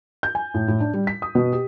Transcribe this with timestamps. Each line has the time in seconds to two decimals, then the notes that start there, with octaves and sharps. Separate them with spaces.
0.23 G6
0.35 G#5
0.54 A2
0.68 A2
0.80 D4
0.94 G3
1.07 B6
1.22 D#6
1.35 B2
1.52 G4